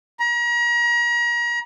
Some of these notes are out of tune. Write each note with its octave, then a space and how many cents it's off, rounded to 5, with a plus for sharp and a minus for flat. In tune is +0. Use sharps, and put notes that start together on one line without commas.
A#5 +35